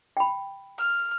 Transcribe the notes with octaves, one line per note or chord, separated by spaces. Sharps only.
G5 B5
F6